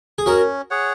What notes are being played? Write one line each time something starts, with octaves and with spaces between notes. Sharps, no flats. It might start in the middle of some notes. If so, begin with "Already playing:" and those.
G#4
C#4 F#4 A#4
G#4 C#5 F#5